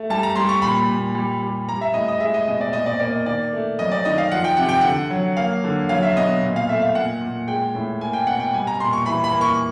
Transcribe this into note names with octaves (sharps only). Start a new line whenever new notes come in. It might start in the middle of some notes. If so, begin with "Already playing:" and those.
Already playing: A3
G3 A5
A#5
G3 C6
C#6
A#2 B5
A#2
G3
G3
G3 A#5
E5
A2 D#5
D#5
G#3 E5
D#5
B2 D#5
D5
A#2 D#5
D5
A#3 D5
D#5
D#3 D5
A3
F#3 D#5
D5
D#3 D#5
F5
F3 F#5
G5
C3 F#5
G5
D3 F#5
F#3
A#3 F5
D3
F#3 F5
E5
B2 D#5
A#2
F5
A3 E5
F5
A#2 F#5
A#2
G#3 G5
A2
A#3 G#5
G5
B2 F#5
G5
G3 G#5
A#5
A#2 C6
C#6
E3 B5
B5
A#3
C#6